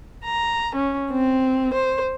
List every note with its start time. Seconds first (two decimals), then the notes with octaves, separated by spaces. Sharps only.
0.25 A#5
0.75 C#4
1.11 C4
1.74 C5